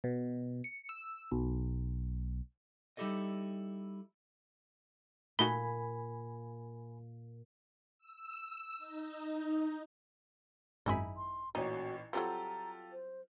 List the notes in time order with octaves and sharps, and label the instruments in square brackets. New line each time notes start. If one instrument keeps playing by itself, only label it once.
[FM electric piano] B2
C#7
E6
B1
[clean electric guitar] G3 D#4 E4 G4 A4 D#5
[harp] A#2 [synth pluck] A3 D#4 F#4 [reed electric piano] G#5 B5 [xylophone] G7
[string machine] E6
D#4
[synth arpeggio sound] G#1 F#2 B5 [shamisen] D#4 E4 G#4
[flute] C6
[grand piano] A1 A#2 C#4 [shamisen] D#4 [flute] F#4
[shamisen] F#3 G3 C4 [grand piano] F4 G4 A4 [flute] A#5
[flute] C5